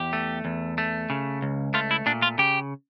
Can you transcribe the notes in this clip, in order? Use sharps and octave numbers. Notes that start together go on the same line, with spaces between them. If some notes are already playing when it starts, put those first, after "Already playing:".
Already playing: E2 G4
A3
E2
A3
C#3
C#2
A3 F4
E4
A#2 D4
F4
C#3 G4